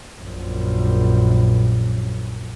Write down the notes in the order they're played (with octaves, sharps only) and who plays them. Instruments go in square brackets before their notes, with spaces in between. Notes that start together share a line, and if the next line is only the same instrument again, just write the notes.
[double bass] A#1 F#2